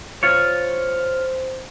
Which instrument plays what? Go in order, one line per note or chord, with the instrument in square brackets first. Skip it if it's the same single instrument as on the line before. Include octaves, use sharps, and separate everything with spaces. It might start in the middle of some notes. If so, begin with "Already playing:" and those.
[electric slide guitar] F4 C#5 [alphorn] C5